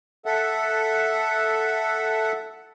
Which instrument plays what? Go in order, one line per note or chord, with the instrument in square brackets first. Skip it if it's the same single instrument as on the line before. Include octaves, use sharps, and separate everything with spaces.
[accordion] A4 E5 F#5